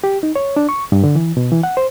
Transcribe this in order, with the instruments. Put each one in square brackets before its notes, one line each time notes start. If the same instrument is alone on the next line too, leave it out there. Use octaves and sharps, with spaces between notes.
[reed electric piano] G4
D#4
C#5
D4
C#6
G2
D3
E3
B2
E3
F#5
C5